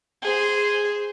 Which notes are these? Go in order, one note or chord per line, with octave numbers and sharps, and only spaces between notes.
G#4 C5